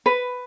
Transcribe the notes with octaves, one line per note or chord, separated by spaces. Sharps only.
B4